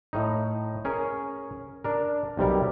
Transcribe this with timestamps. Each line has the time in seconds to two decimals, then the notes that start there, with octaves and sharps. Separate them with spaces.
0.13 A2 D#4
0.85 C#4 G#4 A#4
1.84 D4 A#4
2.37 B1 C3 G3 A#4